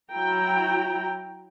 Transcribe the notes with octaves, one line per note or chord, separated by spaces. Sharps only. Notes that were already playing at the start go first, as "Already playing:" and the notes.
F#3 E4 F#4 G5 A#5